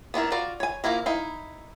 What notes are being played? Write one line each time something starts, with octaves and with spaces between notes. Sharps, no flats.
B3 D4 E4 A#4
F4 F#4 D5
C#5 G#5
F3 G#3 A#3 E4 A#4
D#4 E4 F5